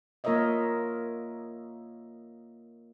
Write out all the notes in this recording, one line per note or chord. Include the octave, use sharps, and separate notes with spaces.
A#3 F4 A#4 C#5 D#5 E5